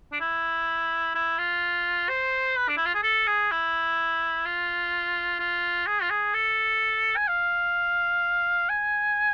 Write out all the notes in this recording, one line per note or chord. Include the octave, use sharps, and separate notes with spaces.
D4
E4
E4
F4
C5
B4
D4
E4
F4
G#4
A4
G#4
E4
F4
F4
G#4
F4
G#4
A4
G#5
F5
G#5